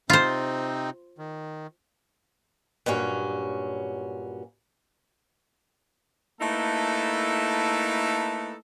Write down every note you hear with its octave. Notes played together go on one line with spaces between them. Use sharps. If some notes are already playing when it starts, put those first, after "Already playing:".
C3 C4 D#4 F4 C5
D#3
G2 A#2 F#3 C#4
A3 A#3 D#4 E4 A4 B4